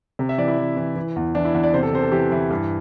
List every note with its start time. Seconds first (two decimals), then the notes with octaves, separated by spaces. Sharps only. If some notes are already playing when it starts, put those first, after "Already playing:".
0.19 C3
0.29 E5
0.38 E3 D5
0.48 E4
0.58 E3
0.77 E3
0.96 E3
1.16 E2
1.35 E3 D4
1.45 E4
1.54 E2 E5
1.64 D5
1.74 C3 C5
1.83 A4
1.93 C3 C5
2.02 A4
2.12 E3 G4
2.31 E3 E4
2.50 G2